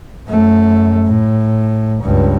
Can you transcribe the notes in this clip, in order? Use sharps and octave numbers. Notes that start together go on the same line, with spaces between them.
F#2 A3
A2
C#2 G2